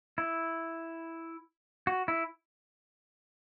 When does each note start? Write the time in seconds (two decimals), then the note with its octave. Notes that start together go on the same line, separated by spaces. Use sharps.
0.18 E4
1.87 F#4
2.08 E4